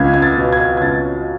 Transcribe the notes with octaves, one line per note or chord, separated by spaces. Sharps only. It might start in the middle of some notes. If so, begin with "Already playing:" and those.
Already playing: C#2 G#6
G#6
A6
B2
G#6
G#6
C#2 A6